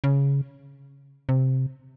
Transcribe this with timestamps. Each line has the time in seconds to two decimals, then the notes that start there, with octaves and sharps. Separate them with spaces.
0.04 C#3
1.29 C3